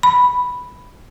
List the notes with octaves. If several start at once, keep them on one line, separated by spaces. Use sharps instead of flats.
B5